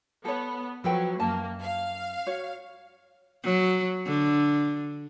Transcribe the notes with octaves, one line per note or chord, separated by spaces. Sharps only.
B3 A4 C#5
F3 F#3 A4 B4 G5
F#2 A#3 A5
F5
F#4 C#5
F#3
D3